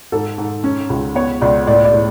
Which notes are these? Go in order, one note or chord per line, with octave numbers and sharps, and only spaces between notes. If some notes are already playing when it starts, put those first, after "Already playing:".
G#2 A4
G#2
C#4
C#2
B3 C#5
C#2 D5
A2 D5
D5
A2